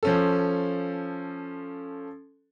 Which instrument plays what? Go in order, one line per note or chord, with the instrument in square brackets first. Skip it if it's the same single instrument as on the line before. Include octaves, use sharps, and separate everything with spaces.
[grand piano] F3 C#4 A4